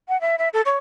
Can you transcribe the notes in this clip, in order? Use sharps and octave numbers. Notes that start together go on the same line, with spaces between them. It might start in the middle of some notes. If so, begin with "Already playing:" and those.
F#5
E5
E5
A4
C#5